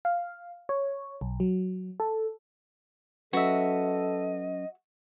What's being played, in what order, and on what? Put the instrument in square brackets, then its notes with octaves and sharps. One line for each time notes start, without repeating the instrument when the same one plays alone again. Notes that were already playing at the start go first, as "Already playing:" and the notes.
[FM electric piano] F5
C#5
B1
F#3
A4
[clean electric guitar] F#3 C#4 B4 [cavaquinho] F#4 E5 [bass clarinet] A4 [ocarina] D#5